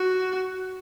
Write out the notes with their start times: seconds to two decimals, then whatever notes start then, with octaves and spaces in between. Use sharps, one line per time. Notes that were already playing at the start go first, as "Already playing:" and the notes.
Already playing: F#4